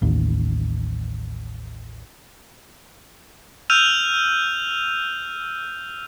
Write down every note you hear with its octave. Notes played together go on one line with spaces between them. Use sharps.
A1 D#2
E6 F6 G6 D#7 F7